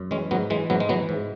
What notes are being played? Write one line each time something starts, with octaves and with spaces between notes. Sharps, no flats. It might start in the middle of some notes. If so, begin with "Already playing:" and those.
Already playing: F#2
E3 G#3 C#4
G#2 F#3 B3
E3 G#3
G#2 F#3 B3
G#3
E3 F#3 B3
G#2